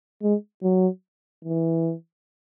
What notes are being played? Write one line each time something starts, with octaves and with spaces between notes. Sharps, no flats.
G#3
F#3
E3